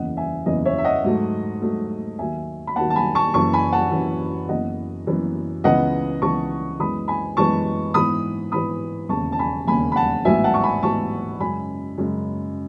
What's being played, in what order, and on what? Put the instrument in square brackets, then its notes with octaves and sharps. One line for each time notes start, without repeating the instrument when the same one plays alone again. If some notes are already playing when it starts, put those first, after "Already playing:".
Already playing: [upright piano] F#1 E2 C#3 E3 D#5 F#5
E5 G#5
F#1 E2 C#3 E3 D#5
C#5 E5
E5
D#5 F#5
G#2 F#3 A3
G#2 F#3 A3
D#2 D#3 F#3 E5 G#5
B5
D#2 D#3 F#3 F#5 A5
A5
G#5 B5
A5 C#6
F#1 F#2 E3 A5 C#6
G#5 B5
F#5 A5
F#1 F#2 E3
F#1 F#2 E3 B3 D#5 F#5
F#1 F#2 E3 B3
C#2 C#3 E3 B3 D#5 F#5
C#2 C#3 E3 B3 A5 C#6
F#2 E3 G#3 B3 B5 D#6
G#5 B5
F#2 E3 G#3 B3 A5 C#6
G#2 E3 B3 B5 D#6
G#2 E3 B3 B5 D#6
E1 D#2 C#3 A5 C#6
A5
G#5 B5
E1 D#2 C#3 G#5 B5
B5
F#5 A5
A1 G#2 F#3 B3 E5 G#5
F#5 A5
C#6
G#5 B5
A1 G#2 F#3 B3 A5 C#6
F#2 C#3 G#3 G#5 B5
F#2 C#3 G#3